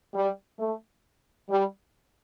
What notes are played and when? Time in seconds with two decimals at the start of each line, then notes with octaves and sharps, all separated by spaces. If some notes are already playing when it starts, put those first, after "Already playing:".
0.14 G3
0.59 A3
1.50 G3